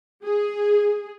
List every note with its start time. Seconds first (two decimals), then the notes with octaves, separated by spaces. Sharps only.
0.24 G#4